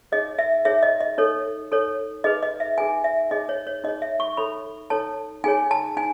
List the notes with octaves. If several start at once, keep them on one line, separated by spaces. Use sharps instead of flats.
D#4 G#4 C#5 D#5
E5
D#4 G#4 C#5 E5
D#5
D#5
D#4 A4 C#5
D#4 A4 C#5
D#4 G#4 B4 D#5
D#5
E5
D#4 G#4 B4 G#5
E5
D#4 G#4 C#5 D#5
C#5
C#5
D#4 G#4 C#5 D#5
E5
C#6
D#4 A4 C#5 B5
D#4 A4 C#5 A5
D#4 G#4 C#5 G#5
A5
D#4 G#5